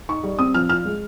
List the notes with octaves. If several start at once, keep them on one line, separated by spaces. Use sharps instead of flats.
D#4 C#6
G3
C4 D#6
F3 F6
F4 F6
G#3